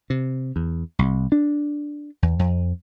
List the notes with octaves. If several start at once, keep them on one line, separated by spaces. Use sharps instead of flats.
C3
E2
C2
D4
E2
F2